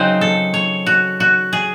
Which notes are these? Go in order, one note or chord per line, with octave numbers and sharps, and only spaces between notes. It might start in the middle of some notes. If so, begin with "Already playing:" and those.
Already playing: C#3 F#3 C4 D#4 C5
A4
C#5
F#4
F#4
G#4